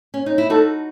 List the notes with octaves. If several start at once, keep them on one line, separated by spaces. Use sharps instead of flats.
C#4
D#4
E4
D#4 F#4 A4